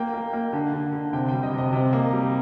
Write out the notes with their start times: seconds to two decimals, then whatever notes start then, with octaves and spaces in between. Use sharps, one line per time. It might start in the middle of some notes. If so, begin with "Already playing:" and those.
Already playing: A#3 G5
0.14 A#3
0.33 A#3
0.53 D3
0.73 D3
0.93 D3
1.13 C3 G5
1.28 G3 G5
1.43 D#5
1.53 C3
1.58 D#5
1.73 C3
1.93 A#3
2.13 G3